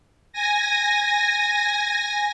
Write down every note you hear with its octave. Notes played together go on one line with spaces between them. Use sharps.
G#5 A#6